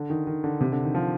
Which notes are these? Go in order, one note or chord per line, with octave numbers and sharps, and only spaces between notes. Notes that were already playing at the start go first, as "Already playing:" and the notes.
Already playing: D3
D#3
D#3
D3
C3
D3
D#3
F3